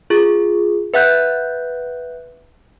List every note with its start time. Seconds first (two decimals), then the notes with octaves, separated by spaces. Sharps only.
0.10 F4 G#4
0.94 B4 E5 F#5 F#6 G6